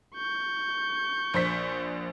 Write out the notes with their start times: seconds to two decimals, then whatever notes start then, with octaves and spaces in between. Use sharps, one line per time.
0.15 C#6 G6
1.34 A#1 C5 B6